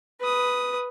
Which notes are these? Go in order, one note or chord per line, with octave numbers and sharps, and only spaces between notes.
B4 D#6